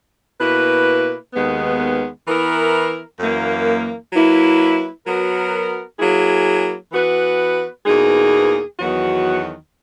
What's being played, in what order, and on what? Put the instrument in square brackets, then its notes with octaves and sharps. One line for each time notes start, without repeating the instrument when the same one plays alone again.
[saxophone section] B2 A#3 E4 B4
D#2 D#3 G#3 B3
E3 B3 E4 A#4
F#2 E3 A#3
F#3 A#3 E4 B4
F#3 B3 F#4 A#4
F#3 A#3 E4 G#4
E3 B3 F#4 B4
E2 B2 A#3 D#4 G#4
E2 D#3 F#3 B3 F#4